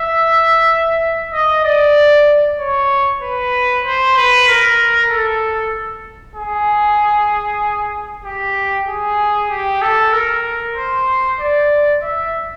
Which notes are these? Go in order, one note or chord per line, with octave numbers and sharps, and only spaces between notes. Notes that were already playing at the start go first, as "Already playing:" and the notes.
Already playing: E5
D#5
D5
C#5
B4
C5
B4
A#4
A4
G#4
G4
G#4
G4
A4
A#4
C5
D5
E5